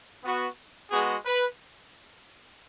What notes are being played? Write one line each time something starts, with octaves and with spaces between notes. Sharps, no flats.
B3 F#4
G#3 B3 F#4 G#4
B4